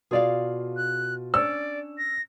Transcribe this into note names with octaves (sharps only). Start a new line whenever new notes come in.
B2 F4 G#4 D5 F5
F#6
C#4 D4 D5 E6
A#6